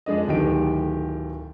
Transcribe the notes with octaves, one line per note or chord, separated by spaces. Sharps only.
F2 G#3 D4 D#5
D1 D2 D#3 G4 A4 D7